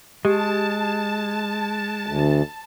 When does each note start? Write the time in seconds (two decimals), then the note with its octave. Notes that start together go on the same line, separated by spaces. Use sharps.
0.25 G#3 G4 A5
2.06 D2